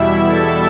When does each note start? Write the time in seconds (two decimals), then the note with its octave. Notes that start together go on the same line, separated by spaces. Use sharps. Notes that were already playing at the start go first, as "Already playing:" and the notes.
Already playing: E2 B2 G3 E4 E5
0.23 A4 A5